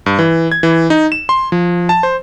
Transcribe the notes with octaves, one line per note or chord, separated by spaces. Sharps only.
G2
E3
G#6
E3
D#4
E7
C6
F3
A5
C5